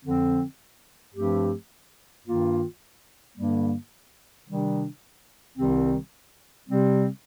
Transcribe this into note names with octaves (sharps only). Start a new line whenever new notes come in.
F2 D3 F3 C4
G2 F3 A3 C4 G4
G2 D#3 A#3 F4
G2 D3 G3 A#3
C3 D#3 G3 D4
C2 C3 D#3 G3 C4
C3 G3 C4